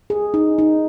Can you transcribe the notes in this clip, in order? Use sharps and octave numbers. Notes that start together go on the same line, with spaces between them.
G#4
D#4
D#4